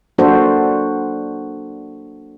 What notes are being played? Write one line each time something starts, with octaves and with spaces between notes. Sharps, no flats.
F#3 A#3 D4 F#4 A4 C5